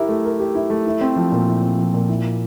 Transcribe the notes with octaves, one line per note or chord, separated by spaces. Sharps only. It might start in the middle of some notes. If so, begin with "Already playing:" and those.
Already playing: E4 G4 A#4
A3
A#4
G4
E4
A3
E4
C4
F3
A#2
E4
C4
F3
A#2
E4
A#3